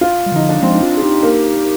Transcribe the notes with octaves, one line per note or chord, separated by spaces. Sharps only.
F4
G3
D3 F3 D#4
D4
F3 G#3 C4
D#4
D4 F4
G#4
D#4 G4
A#3